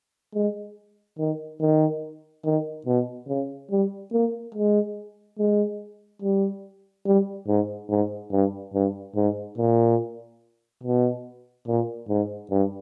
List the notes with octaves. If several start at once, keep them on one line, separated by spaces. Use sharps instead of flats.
G#3
D#3
D#3
D#3
B2
C#3
G3
A#3
G#3
G#3
G3
G3
G#2
G#2
G2
G2
G#2
A#2
B2
A#2
G#2
G2